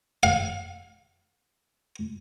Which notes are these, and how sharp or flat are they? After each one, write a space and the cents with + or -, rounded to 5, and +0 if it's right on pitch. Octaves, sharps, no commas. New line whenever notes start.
F5 +30